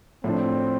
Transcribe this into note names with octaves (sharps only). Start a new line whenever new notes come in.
A2 F3 A3 C4 D4